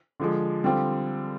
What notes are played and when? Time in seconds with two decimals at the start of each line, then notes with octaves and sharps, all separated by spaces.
0.20 D3 F3 G#3
0.64 D3 G3 C4 F4